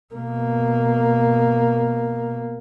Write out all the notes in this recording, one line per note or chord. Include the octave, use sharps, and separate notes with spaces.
B2 A#3